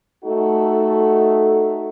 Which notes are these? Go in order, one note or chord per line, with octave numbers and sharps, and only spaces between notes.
A3 D#4 F#4 A4